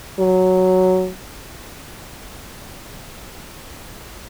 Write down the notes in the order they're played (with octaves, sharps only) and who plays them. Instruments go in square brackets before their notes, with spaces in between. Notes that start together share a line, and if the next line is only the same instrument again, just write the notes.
[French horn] F#3